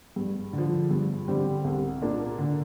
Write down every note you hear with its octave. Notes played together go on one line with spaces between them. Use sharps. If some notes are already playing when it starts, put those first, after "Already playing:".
G2
D3 F3
G2
D3 G3 C4 G4
C2
A#2 A#3 D4
D3